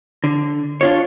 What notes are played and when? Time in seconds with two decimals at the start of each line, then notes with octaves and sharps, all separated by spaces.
0.24 D3
0.81 D4 F4 C#5